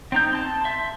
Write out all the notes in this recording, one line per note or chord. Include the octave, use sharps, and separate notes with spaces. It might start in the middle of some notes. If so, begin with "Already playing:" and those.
C4 D#4 G6
A5 C6
E5 C6